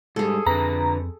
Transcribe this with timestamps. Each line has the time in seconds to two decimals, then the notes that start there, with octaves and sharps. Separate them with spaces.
0.16 G#2 G3 G#4 A4
0.47 F2 D3 C4 B4 A#5